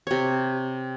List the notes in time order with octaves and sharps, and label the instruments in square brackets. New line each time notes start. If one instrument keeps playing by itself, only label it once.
[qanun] C3 C#5